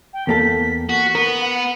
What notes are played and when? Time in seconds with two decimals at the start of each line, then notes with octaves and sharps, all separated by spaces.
0.14 G5
0.27 E2 A#3 A4 B6
0.89 F#4 B6
1.15 B3 A#4
1.40 F#5